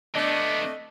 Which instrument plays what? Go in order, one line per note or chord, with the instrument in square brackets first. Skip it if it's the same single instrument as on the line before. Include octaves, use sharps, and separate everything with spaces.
[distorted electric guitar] D3 B3 [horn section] A3 D4 [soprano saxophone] D#5